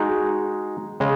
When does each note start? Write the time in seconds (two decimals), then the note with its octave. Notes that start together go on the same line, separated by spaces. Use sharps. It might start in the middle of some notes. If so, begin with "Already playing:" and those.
Already playing: G#3 D#4 F#4
1.00 C#3 G#3